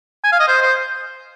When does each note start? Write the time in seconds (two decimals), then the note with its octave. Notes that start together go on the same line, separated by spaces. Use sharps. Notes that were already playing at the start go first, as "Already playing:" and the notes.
0.24 G#5
0.33 F5
0.40 D#5
0.48 C5
0.62 C5